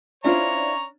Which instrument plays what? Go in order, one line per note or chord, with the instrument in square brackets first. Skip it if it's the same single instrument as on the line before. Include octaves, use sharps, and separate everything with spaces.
[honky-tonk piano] C#4 D4 [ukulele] E4 F4 C5 [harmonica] C#5 A#5